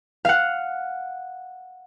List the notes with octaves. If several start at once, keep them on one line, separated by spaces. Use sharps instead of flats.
F5 F#5